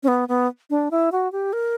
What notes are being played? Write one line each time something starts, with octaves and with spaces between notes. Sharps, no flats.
C#4
B3
B3
D4
E4
F#4
G4
A#4